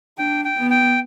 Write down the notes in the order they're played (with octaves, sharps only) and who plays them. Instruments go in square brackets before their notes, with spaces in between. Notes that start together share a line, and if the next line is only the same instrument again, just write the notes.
[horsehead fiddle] D4 [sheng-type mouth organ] G5
[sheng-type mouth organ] G5
[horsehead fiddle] B3
[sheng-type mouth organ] G5